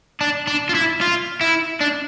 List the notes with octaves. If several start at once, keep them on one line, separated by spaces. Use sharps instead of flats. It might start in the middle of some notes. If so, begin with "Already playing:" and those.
D4
D4
F4
E4
F4
E4
D4